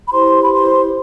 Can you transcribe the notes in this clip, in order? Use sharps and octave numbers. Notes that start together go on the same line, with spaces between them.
B5
E4 G4 B4 C5 C6
B5
C5 C6